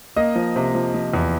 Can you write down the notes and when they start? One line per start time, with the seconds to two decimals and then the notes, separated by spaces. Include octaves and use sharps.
0.16 A#3 D#5
0.36 F3
0.56 C3
0.75 F3
0.94 F3
1.13 E2